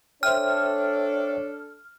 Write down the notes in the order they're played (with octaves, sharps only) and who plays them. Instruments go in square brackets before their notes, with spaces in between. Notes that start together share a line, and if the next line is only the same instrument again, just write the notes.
[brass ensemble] D4 A4 [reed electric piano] C5 E5 G5 [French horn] C#5 [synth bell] F6